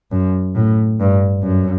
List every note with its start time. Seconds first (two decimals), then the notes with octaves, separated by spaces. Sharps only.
0.12 F#2
0.55 A2
1.00 G2
1.43 F#2